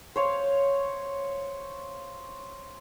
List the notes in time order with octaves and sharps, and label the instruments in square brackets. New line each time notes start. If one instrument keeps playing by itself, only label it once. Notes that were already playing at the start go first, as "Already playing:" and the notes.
[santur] C5 C#5 F5